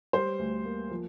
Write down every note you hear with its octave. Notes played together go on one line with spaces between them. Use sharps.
G3 C5
D2
A#3
F3